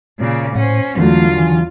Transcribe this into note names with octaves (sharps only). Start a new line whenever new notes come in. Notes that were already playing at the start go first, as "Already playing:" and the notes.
A#2 C#3
A2 C#4 C5 F#5
E2 D3 E3 F#3 G#3 A3 F4
D#3 E3 G#5